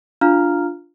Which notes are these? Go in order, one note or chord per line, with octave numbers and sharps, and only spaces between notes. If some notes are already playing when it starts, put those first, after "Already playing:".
D4 F4 F5 A#5 F6